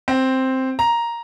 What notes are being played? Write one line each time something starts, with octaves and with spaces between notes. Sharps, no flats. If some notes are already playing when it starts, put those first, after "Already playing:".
C4
A#5